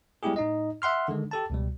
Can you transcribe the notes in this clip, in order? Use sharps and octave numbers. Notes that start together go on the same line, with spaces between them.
G3 G#3 B3 E4 G4 G#4
A2 D#4 D#5
E5 F#5 C6 F6
D3 D#3 G#3
G4 A4 A5
C#2 B2 G3